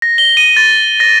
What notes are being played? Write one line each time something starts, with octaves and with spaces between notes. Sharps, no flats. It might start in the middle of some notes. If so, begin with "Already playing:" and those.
A#6
G7
D#7
A6
A#6